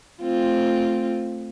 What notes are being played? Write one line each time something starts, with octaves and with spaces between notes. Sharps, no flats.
A3 C4 F4